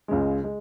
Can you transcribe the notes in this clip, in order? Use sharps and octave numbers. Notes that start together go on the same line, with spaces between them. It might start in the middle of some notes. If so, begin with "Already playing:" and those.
C#2 C#3 G#3
G#3